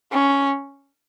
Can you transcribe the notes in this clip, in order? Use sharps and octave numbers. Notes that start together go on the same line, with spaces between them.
C#4